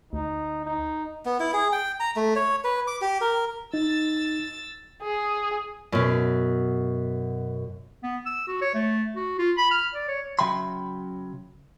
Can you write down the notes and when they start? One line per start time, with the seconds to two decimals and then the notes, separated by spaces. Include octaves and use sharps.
0.13 D2 D#4
0.65 D#4
1.25 B3
1.40 E4
1.53 G#4
1.72 G5
2.00 A#5
2.16 A3
2.36 C#5
2.64 B4
2.87 D6
3.02 G4
3.21 A#4
3.74 D#4 E6 A6
5.02 G#4
5.92 F#2 B2
8.03 B3
8.26 E6
8.47 F#4
8.62 C#5
8.74 A3
9.16 F#4
9.39 F4
9.58 B5
9.71 F6
9.95 D5
10.08 C#5
10.39 C#3 F#3 E5 G5 B5 C6